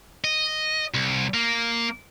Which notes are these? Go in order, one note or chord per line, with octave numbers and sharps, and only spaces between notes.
D#5
C2
A#3